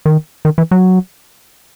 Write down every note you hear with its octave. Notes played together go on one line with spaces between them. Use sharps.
D#3
D#3
E3
F#3